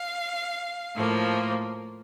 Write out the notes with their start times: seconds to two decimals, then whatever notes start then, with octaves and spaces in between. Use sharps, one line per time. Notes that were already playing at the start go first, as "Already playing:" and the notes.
Already playing: F5
0.95 A2 F3 A#3